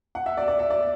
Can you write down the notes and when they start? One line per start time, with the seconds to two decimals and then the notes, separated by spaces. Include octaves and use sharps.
0.15 F#5
0.26 E5
0.37 D5
0.48 D5
0.59 E5
0.70 D5